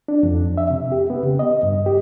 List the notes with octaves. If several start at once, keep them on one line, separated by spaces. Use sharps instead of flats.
D4
F2
E5
C3
G4
B3
C#3
D#5
G2
G4